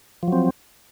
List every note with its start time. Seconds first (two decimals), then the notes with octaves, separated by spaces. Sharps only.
0.23 F3
0.28 F#3
0.32 C4